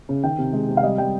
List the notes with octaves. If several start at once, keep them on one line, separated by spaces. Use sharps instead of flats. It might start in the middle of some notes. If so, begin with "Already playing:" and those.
C#3
D#3 G5
C3
G#3
C3
F5
G3 D#5
G3 G5